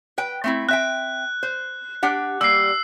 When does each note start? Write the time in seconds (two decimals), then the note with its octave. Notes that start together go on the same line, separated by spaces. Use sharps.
0.18 B4 G5
0.44 A3 C4 E4
0.69 C4 E5 G5 F#6
1.43 C5
2.03 D4 G4 F#5
2.41 G3 A#3 E6 C7